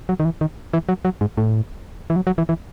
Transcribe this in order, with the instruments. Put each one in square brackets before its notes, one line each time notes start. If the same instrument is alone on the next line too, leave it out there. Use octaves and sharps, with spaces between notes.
[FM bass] F#3
D#3
E3
D#3
E3
F#3
F#3
G#2
A2
E3
F#3
F#3
E3
E3